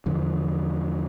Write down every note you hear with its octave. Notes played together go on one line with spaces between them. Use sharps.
E2 D3 F3